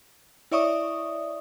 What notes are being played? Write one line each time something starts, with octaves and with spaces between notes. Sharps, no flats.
E4 C#5 D5 E5 C#6 D#6